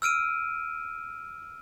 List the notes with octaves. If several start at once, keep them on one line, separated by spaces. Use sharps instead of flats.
E6 F6 D7 D#7